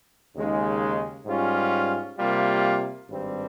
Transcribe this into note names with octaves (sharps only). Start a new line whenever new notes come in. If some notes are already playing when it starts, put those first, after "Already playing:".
D#2 C#3 G#3 D#4
G#2 G3 C#4 F4
C3 G3 A#3 F4
G#1 G2 G3 C4